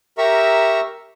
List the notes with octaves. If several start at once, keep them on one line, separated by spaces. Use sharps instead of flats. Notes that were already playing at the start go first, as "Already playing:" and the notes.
G4 A#4 E5 A#5 C#6 E6